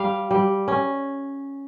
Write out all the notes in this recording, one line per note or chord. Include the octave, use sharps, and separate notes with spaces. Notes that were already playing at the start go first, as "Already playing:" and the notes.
Already playing: G3 F5
G3
C#4